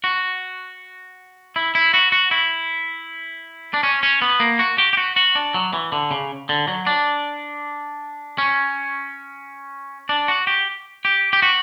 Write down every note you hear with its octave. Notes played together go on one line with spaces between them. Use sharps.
F#4
E4
E4
F#4
F#4
E4
D4
C#4
C#4
B3
A#3
F#4
G4
G4
F#4
F#4
D4
F#3
E3
D3
C#3
D3
F#3
D4
C#4
D4
F#4
G4
G4
G4
F#4